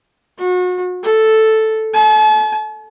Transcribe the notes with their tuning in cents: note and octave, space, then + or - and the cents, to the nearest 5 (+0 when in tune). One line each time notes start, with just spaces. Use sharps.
F#4 -35
A4 +0
A5 -45